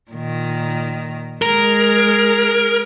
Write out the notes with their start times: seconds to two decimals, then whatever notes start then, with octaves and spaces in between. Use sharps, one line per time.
0.12 A#2 D#3
1.42 G#3 G#4 A#4